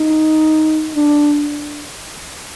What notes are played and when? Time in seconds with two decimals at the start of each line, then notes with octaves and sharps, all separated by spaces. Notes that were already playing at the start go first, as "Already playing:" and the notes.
Already playing: D#4
0.95 D4